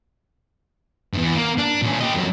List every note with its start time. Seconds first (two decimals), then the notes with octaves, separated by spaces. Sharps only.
1.14 E2 G2
1.35 A#3 A#4
1.58 D4
1.82 A#2 C#4
2.00 G4 D#5
2.14 F2 F#3